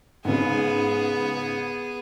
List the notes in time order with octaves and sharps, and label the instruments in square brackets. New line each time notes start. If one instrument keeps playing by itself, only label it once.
[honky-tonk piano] G#2 C#3 [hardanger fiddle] B3 G#4